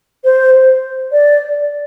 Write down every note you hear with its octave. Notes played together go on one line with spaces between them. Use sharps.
C5
D5